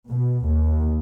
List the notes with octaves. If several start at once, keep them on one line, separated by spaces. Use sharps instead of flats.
B2
D#2